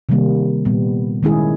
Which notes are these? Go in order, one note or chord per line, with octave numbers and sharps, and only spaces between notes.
C3 D#3 G3 A#3
A#2 G3 B3
D#3 G#3 C#4 E4 G#4